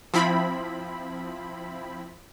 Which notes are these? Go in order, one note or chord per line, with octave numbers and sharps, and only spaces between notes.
F3 C4 E4 B5